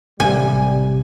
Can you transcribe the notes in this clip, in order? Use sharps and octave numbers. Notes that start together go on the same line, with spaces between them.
A1 C3 G3 G#5